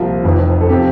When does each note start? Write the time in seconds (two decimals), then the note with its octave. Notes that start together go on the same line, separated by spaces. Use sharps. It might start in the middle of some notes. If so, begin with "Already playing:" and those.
Already playing: C2 A#2 F3 F4
0.24 F1 F2 E3
0.61 A4
0.69 C3 F3 G4